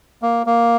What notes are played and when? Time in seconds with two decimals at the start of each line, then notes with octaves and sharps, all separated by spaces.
0.22 A#3
0.46 A#3